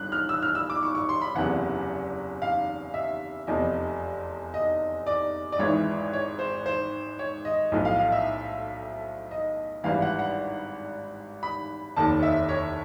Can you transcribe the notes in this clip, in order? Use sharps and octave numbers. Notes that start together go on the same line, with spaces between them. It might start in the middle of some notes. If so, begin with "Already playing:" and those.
Already playing: G1 G2 F#6
F6
E6
F6
E6
D6
C#6
C#6
C6
B5
F#1 E2 C3 E3 F#5
F5
E5
F1 E2 C3 F3 D#5
D#5
D5
D5
G#1 G#2 E3 C#5
C#5
C5
C5
C#5
D#5
B1 A2 F3
F5
F5
E5
D#5
G#1 G2 E3 F5
F#5
F#5
B5
F1 D#2 D#3 A5
E5
C#5